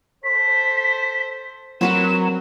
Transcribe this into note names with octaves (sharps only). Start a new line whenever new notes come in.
A4 C5 B6
F#3 C4 F#4 A#4 B4 E7